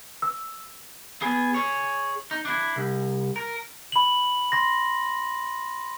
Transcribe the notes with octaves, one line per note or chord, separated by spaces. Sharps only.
E6
B3 G#4
G#4 C#5
D#4
D4 E4
C2
A#4
B5 F#7
C6 A#6